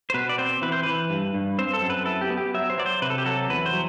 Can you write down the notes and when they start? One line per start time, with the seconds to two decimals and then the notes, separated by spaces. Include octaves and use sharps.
0.10 C5
0.14 B2 B4
0.29 D5
0.38 C4 C5
0.62 E3 B4
0.72 C5
0.83 E3 B4
1.10 G2
1.34 G2
1.59 C4 C5
1.73 A4
1.82 F#2
1.90 B4
2.05 E4 A4
2.21 G4
2.30 B3
2.38 G4
2.54 F#3 E5
2.70 C5
2.78 F#3 D5
2.86 C5
3.02 C3 B4
3.10 A4
3.18 G4
3.25 F#3 A4
3.50 E2 B4
3.66 C5
3.73 F#3